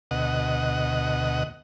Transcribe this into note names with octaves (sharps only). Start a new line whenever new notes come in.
D2 B2 D#5 F#5